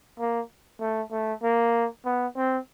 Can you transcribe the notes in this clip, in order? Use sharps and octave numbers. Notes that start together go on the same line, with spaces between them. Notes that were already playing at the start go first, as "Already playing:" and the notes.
A#3
A3
A3
A#3
B3
C4